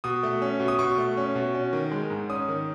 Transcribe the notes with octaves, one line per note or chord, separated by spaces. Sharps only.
B2 D#6
A3
C#4
B2
D#6
B2 C#6
A3
C#4
B2
C#4
D#3
G#3
G#2
C#4 D#6
D#3